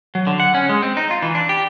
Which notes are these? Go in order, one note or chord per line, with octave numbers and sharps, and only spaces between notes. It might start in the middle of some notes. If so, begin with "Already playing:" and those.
F#3
D3
F#5
C#4
G#3
C4
D#4
F4
E3
D4
G4